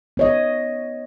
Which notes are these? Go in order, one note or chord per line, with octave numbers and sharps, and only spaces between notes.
B3 C#5 D#5